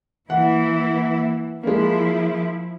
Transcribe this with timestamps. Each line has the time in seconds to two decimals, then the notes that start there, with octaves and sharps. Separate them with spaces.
0.30 E3 A#3 E4 F#5
1.63 F3 G#3 A#3 E4